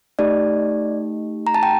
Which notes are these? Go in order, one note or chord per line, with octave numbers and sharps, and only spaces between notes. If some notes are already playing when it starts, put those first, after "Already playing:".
A3 D#4 G4 D5
A#5
A5
G5